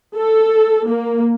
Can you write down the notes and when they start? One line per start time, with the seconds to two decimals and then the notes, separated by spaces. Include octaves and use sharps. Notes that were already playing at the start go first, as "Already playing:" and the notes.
0.16 A4
0.87 A#3